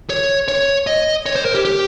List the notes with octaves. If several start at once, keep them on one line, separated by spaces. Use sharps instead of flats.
C#5
C#5
D#5
C#5
C5
A#4
G4
G4